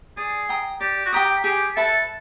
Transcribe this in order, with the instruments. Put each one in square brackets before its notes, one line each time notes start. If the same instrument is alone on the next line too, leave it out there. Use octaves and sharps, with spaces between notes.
[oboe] G#4 [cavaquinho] D5
[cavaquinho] G5 A#5 D#6
[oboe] G4 [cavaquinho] D5
[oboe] F#4
[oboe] G4 [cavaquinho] G5 A#5 D#6
[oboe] G4 [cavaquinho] G#4
[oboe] A4 [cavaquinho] B4 E5 A5